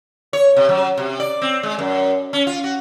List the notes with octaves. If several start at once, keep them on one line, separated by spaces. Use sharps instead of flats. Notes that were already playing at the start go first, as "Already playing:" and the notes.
C#5
C3
F#3
C3
D5
C4
G#3
F#2
C#4
F4
F#4